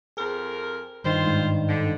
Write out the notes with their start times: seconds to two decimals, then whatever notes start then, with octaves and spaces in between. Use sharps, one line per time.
0.17 F2 G#4 A#4
1.04 G2 D#3 F4 C5
1.26 G#2
1.67 D3